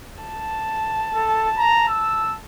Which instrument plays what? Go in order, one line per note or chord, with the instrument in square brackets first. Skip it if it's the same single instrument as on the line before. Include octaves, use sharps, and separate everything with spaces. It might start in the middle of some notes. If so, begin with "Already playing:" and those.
[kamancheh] A5
[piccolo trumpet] A4
A#5
E6